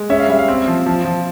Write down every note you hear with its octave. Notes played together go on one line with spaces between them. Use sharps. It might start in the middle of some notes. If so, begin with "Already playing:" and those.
Already playing: G#3
C#4 E5
F5
G3 E5
F5
C4
F3
F3
F3